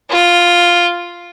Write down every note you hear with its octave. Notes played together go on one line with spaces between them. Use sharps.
F4